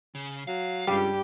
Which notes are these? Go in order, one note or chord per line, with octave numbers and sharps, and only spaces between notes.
C#3
F#3 F5
C#2 G2 G3 G4